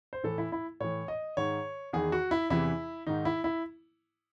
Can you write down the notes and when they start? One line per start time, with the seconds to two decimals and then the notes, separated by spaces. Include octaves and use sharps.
0.13 C5
0.23 A2 E3 A4
0.38 E4
0.52 E4
0.80 A2 E3 C#5
1.08 D#5
1.37 G#2 D#3 C#5
1.93 E2 D#3 G#4
2.12 F#4
2.31 E4
2.50 E2 C3 E3 E4
3.07 G#2 D#3 D#4
3.25 E4
3.44 E4